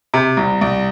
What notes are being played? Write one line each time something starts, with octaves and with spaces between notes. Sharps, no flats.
C3
C2
C2